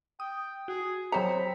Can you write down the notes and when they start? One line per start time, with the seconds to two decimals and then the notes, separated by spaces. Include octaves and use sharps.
0.20 G5 D#6
0.68 F#4 G#4
1.12 F#3 C4 C5 C#5 A#5 B5 C#7